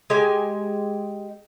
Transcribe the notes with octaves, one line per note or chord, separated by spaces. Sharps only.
G#3 G4 G#5